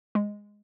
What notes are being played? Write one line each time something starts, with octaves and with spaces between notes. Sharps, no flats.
G#3